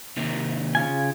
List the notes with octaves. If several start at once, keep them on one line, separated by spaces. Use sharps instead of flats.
C3 D#3 A#3
C#3 F4 G#5